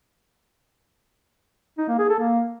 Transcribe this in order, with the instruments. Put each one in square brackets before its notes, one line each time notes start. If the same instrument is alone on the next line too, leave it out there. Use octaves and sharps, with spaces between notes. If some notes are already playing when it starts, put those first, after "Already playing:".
[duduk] D#4
A#3
G#4
A4
A#3